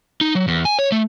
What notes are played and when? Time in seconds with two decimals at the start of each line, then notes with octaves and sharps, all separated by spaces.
0.21 D#4
0.35 F#3
0.48 E2
0.65 G#5
0.79 C#5
0.92 A3